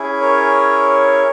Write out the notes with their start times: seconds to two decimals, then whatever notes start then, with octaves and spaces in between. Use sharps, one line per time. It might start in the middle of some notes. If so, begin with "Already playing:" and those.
Already playing: C#4 E4 G#4
0.21 A#4 C#5